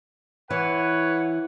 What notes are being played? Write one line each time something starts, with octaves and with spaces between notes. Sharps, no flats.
E3 B4 C#5 F#5